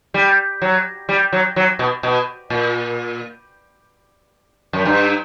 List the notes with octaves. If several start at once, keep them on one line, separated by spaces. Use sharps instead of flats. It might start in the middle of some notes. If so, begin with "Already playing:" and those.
G3
F#3
G3
F#3
F#3
B2
B2
A#2
F#2
G2